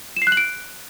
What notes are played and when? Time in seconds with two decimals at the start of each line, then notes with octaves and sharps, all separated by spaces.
0.16 E7
0.22 C7
0.27 F#6
0.32 F#7
0.37 D7